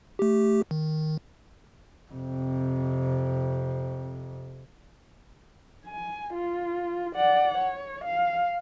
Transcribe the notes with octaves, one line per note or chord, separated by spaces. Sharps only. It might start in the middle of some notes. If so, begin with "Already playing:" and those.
A3 G4
D#3
F2 C3
G#5
F4
D5 F#5
C#5
F5